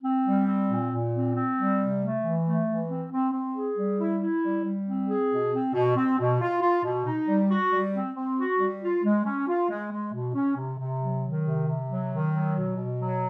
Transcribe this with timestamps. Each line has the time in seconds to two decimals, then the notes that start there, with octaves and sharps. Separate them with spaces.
0.03 C4
0.26 G3
0.47 C4
0.70 A#2
0.92 A#2
1.13 C4
1.35 C4
1.57 G3
1.78 C3
2.01 A3
2.23 E3
2.45 A3
2.67 E3
2.89 C4
3.11 C4
3.33 C4
3.55 G#4
3.77 G3
3.99 E4
4.21 E4
4.43 G3
4.64 G3
4.87 C4
5.08 G#4
5.30 B2
5.51 C4
5.73 B2
5.96 C4
6.19 B2
6.40 F4
6.61 F4
6.83 B2
7.05 D#4
7.27 G3
7.49 F#4
7.72 G3
7.94 C4
8.15 C4
8.37 F#4
8.59 G3
8.82 F4
9.03 G#3
9.25 C#4
9.48 F4
9.69 G#3
9.91 G#3
10.12 B2
10.34 C#4
10.56 C3
10.78 C3
11.01 F#3
11.23 D#3
11.45 C3
11.67 C3
11.88 F#3
12.11 D#3
12.33 F#3
12.54 B2
12.77 B2
12.98 F#3